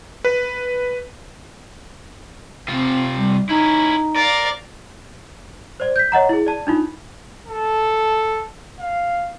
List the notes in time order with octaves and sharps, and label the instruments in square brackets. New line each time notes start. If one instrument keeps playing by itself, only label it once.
[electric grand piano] B4
[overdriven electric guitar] C3 F4 [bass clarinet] C4
[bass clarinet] G3
[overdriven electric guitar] C#4 E4 [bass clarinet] D#4
[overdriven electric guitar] A#4 [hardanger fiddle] D5 F5
[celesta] C5 D5
G6 B6
C#5 D#5 F#5 A#5
E4 G#4
D5 A5
D4 D#4 F4
[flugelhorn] A4
F5